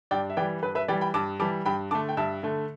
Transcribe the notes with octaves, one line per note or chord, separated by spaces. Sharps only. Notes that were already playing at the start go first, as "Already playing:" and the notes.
G2 D5 G5
E5
E3 G3 D5 G5
G2 B4
B4 E5
E3 G3 D5 G5
G5 B5
G2 A5 D6
E3 G3 A5 D6
G2 G5 B5
D3 A3 A5 D6
G5
G2 E5 A5
D3 A3